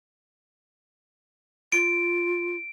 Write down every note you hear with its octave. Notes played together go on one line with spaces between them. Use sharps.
F4 D7